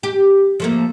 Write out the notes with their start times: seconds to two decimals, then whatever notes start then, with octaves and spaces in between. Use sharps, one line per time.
0.03 G4
0.60 F3 A3 A#3